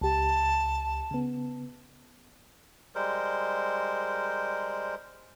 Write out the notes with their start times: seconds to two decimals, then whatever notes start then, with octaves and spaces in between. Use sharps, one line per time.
0.01 C#2 G4 A5
1.11 C#3 B3
2.95 G3 G#3 A#4 C5